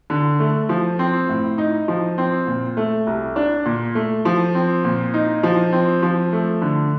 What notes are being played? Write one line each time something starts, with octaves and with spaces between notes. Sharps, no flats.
D3
A3
F3
C4
A2
D#4
F3
C4
A#2
A3
C2
D4
A#2
A3
F3
C4
A#2
D#4
F3
C4
F3
A3
D3